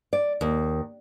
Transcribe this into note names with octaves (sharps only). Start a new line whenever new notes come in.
D5
D#2